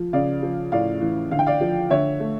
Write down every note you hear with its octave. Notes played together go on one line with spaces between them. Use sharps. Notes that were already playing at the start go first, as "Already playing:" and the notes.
Already playing: F3
C#3 D5 F5
F3
A2 D5 F5
E3
D3 F5
G5
D5 F5
F3
D3 C#5 E5
A3